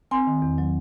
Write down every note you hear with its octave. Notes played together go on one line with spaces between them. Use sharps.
C4 G#5 C6
D#3
E2
F#3